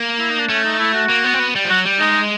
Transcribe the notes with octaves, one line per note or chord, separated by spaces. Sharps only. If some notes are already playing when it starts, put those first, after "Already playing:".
Already playing: A#3
E4
D#4
D4
A3 C#4
D#4
E4
F#4
A#3
B3
C4
B3
G3
F3
F#3 F#4
G3
G#3 D#4